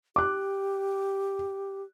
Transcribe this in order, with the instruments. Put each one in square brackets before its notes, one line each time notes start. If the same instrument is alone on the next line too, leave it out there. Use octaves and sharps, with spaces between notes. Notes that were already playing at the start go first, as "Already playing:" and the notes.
[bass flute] G4 [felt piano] D6 F#6